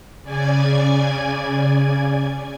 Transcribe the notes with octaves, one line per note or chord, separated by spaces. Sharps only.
C#3 D5 G#5 G#6